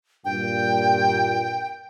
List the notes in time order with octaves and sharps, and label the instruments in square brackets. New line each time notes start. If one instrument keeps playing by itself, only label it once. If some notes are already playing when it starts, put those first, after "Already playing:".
[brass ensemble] G2 A#2 [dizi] G5